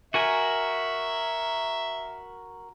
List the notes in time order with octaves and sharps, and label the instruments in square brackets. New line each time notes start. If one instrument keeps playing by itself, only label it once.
[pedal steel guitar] F#4 A#4 G#5 [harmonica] E5